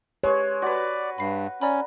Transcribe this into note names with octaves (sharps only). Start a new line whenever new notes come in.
G#3 G4 B4 C#5
F#4 B4 D5 C6
G2 B5 C7
C#4 D5 A#5 B5